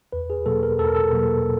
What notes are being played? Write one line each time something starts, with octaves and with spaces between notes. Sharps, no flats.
E2 B4
G#4
B2 F#3 A#3 A4
A#4
E2 A4
A#4
A4
B2 F#3 A#3